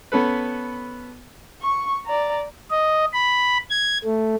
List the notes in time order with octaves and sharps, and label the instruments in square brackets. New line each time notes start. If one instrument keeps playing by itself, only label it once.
[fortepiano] B3 C#4 A4 B4
[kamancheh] C#6
D5 A#5
[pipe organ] D#5
B5
G#6
A3